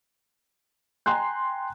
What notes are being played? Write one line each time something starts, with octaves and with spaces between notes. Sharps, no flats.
G5 G#5 A#5 C6 F#6